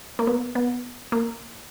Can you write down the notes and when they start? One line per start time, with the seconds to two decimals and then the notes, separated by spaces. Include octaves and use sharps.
0.19 A#3
0.27 B3
0.55 B3
1.12 A#3